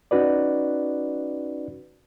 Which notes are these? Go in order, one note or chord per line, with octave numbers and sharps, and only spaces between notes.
C#4 D#4 F#4 B4 D5